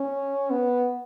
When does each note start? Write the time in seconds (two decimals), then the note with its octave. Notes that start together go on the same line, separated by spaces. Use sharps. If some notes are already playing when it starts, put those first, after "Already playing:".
Already playing: C#4
0.51 B3